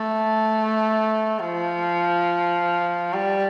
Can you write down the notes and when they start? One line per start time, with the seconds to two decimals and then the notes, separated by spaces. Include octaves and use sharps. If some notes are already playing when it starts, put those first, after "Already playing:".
Already playing: A3
1.39 F3
3.13 G3